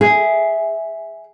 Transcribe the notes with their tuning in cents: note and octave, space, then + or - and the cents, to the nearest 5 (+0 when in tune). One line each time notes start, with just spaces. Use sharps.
G#4 +0 E5 -5